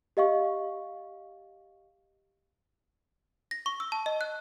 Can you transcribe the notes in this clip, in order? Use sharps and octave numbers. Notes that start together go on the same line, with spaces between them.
G4 D#5 F5 C#6
A#6
C#6
E6
A5
D#5
F#6